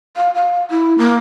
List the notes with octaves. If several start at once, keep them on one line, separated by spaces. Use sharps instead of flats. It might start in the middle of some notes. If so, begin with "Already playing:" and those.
F5
F5
E4
A#3